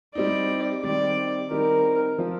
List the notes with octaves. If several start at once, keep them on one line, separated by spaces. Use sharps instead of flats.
G3 C4 D#4 D5
D#3 G3 C4 G4 D5
D#3 G3 C4 D#4 G4 A#4
F3 C4 F4